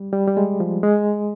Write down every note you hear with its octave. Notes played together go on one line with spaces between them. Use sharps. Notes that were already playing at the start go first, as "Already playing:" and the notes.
Already playing: G3
G3
G3
G#3
F3
G#3